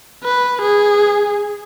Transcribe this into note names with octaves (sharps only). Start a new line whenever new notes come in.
B4
G#4